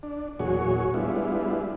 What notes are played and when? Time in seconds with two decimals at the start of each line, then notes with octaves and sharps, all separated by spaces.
0.03 D4
0.39 E2 A#2 F#3 F#4 G#4 C#5
0.94 G3 G#3 B3 D4 E4 F4